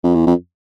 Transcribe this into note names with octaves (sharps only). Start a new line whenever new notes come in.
F2
E2
F2